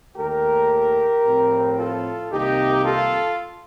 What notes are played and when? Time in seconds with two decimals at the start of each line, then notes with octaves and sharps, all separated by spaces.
0.17 D#2 D#3 A3 G4 A#4
1.25 A2 F3 C4
1.77 F4 A4
2.31 C2 C3 D#3 A#3 D#4 G4
2.85 F4 A4